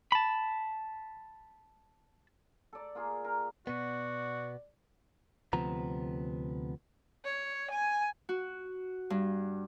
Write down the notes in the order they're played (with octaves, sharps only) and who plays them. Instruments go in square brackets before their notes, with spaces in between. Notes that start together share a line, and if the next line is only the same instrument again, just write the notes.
[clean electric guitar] A5 B5
[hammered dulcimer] A4 D5
A#3 F4 G#4
A#4
[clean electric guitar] B2 B3 [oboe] F#4 [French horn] D5
[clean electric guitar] D2 C3 F3 B3 A#5
[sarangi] C#5
G#5
[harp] F#4
G2